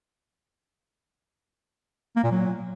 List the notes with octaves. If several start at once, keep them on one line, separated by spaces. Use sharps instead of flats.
A#3
A#2
F#3